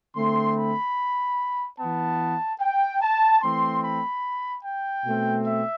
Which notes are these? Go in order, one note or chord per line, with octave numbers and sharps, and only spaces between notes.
D3 A3 C4 C6
B5
E3 B3 A5
G5
A5
E3 A3 C4 C6
B5
G5
B2 A3 C4
E5